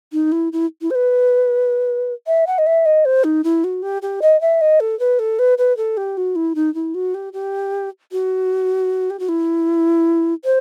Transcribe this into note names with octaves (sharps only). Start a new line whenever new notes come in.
D#4
E4
E4
E4
C5
B4
E5
F#5
D#5
E5
D#5
C5
D#4
E4
F#4
G4
G4
D#5
E5
D#5
A4
B4
A4
B4
B4
A4
G4
F#4
E4
D#4
E4
F#4
G4
G4
F#4
G4
F#4
E4
C5